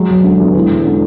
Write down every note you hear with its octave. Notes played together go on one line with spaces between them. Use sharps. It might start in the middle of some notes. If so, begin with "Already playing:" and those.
Already playing: F#3 G#3
E1
D3
E2
E3 G#3
E1
D3